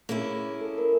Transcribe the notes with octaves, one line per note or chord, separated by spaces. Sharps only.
A#3 C#4 E4 G#4
A4
A#4